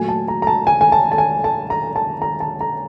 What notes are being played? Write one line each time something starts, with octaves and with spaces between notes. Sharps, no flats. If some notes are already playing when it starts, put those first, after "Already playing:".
Already playing: A#2 F#3 A3 G#5
A5
A#5
A#5
A5
G#5
G#5
A5
A5
G#5
A5
A#5
A5
A#5
A5
A#5